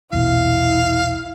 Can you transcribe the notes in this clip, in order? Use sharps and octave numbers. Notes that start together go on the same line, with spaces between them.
A#1 E2 B2 E4 F5